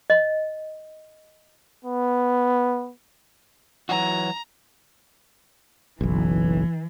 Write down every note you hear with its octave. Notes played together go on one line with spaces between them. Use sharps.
D#5
B3
E3 F#3 F#4 A#5
F#1 B1 E3